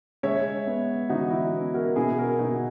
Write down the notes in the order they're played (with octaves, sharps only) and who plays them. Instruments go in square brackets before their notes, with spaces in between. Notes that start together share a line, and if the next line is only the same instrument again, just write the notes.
[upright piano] G#3 C#5 E5
B3
E3 D#4 F#4
E4
B3
F#4 A#4
B2 E4 G#4
F#4 A#4
B2 D#4 F#4